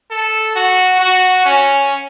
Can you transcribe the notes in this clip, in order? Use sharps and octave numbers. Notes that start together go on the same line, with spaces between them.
A4
F#4
F#4
C#4